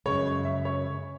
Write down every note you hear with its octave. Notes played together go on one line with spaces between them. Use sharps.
F#2 C#3 G#3 C#5
E5
C#5